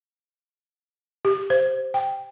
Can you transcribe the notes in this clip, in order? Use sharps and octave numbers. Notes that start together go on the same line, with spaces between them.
G4
C5
G5